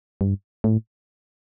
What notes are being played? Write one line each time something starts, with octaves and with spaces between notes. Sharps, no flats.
G2
A2